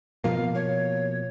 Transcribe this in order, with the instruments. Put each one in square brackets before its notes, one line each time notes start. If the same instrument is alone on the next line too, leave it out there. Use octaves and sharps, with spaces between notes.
[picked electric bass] B2 F3 A#3 [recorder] F5
[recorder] C#5